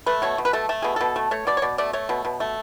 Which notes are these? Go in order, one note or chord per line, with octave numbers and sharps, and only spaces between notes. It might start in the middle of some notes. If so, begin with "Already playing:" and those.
A3 B4
B2 C#5
B2
B4
A3 A4
A3 A4
B2 G#4
B2 A4
A3
A3 C#5
B2 D5
C#5
B2 D5
A3 D5
A3 C#5
B2
B2
A3